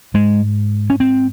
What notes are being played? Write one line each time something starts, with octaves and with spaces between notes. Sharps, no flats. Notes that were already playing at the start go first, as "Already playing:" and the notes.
G#2 G#3
C#4
C4